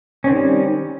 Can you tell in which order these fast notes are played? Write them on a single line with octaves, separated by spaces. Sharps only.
C#4 C4 D#3 G3